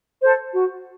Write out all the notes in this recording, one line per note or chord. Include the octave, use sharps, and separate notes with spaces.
A4 C5
F#4